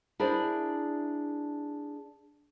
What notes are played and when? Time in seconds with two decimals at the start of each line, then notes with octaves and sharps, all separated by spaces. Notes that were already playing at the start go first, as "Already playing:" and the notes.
0.19 D4 E4 G#4 A#4 C5 D5